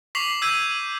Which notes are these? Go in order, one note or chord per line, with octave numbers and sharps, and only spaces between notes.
C#6 D6 B6 C7 F7 F#7
E6 G6 G#6 B6 D#7